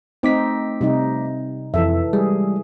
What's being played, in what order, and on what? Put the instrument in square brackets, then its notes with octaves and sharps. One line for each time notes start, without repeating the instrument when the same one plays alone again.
[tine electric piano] A3 D6 B6 [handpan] C4 D#4
[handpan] C3 G3 D#4
[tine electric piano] F2 [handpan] E3 A4 E5
[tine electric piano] G3 G#3 [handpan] G#4